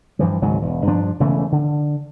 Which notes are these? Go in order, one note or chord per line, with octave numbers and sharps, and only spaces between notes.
G2 E3 F3
G#1 C#2 G#2 F#3
E1
G2 F3 D4
E1 C#3 E3 A3
D3